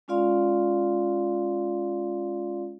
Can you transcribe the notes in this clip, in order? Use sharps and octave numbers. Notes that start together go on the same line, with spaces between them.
G#3 C#4 F4 D5 F5 C6